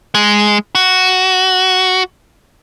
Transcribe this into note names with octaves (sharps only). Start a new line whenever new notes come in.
G#3
F#4